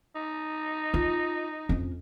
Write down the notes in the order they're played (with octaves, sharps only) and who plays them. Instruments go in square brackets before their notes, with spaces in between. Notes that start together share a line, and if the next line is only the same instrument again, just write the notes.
[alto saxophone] D#4
[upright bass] F4
F2 C#4